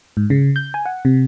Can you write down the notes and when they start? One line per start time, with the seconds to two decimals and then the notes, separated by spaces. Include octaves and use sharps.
0.17 G#2
0.30 C#3
0.56 G6
0.74 G#5
0.86 F#5
1.05 C3